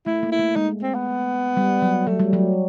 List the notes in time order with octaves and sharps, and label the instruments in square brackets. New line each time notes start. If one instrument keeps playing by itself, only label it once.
[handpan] A3 [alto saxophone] E4
[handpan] A#3
[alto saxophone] E4
[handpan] A3
[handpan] G#3 [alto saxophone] D#4
[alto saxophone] C4
B3
[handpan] G3
F#3
[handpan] F#3 [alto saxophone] A3
[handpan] G3
F#3